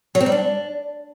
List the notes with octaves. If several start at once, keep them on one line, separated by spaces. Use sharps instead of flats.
F#3
C4
G3
D4